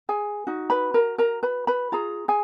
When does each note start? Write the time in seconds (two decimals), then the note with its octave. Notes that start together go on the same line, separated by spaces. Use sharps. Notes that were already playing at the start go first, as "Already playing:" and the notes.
0.09 G#4 G#5
0.47 D#4 F#4
0.70 B4 B5
0.94 A#4 A#5
1.18 A#4 A#5
1.43 B4 B5
1.67 B4 B5
1.92 F4 G#4 A#5
2.28 G#4 G#5